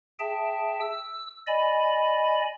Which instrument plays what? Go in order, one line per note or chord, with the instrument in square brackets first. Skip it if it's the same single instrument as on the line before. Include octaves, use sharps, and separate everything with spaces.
[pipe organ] G#4 E5 G5 A5
E6
D5 D#5 G#5 B5